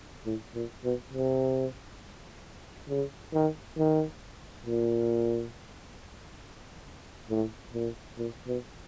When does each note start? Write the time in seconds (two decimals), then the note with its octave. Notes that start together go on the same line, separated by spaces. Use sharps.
0.26 A2
0.54 A#2
0.84 B2
1.13 C3
2.89 C#3
3.33 D#3
3.77 D#3
4.66 A#2
7.29 A2
7.74 A#2
8.18 A#2
8.47 B2